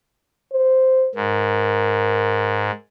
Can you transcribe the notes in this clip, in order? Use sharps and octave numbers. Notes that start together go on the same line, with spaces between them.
C5
G#2 A#4